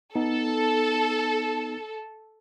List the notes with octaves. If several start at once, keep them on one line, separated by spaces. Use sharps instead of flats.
B3 D#4 A4